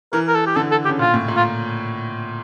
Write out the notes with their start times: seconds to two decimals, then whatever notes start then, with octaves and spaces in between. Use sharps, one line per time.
0.12 E3 A#4
0.27 A#4
0.35 A4
0.46 G4
0.56 D3 A4
0.71 A4
0.85 G4
0.88 C#3
0.99 A#2 F4
1.14 A2
1.28 A#2
1.36 F4